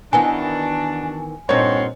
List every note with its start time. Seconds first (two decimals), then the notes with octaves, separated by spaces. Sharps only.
0.13 D#3 E3 B3 D4 F#4 G#5 A5
1.49 G2 A#2 C4 D#4 C#5 F#5 C6